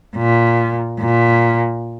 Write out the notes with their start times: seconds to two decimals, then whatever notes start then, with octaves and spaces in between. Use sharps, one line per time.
0.16 A#2
1.00 A#2